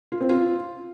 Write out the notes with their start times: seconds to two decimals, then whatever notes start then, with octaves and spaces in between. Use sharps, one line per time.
0.12 F4
0.20 C4
0.29 F4